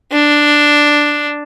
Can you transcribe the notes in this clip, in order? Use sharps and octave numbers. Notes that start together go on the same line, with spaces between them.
D4